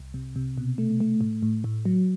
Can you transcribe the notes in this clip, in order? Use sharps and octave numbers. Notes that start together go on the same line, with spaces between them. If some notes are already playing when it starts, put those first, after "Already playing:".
Already playing: C2
C3
C3
B2
A3
A3
A2
A2
A2
F#3